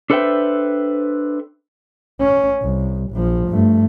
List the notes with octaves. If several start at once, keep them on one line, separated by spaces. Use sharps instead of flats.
D4 A4 B4 C5 E5 G5
C#4
C2
A#1 F3
G2 A3